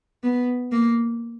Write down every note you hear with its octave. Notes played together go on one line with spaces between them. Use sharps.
B3
A#3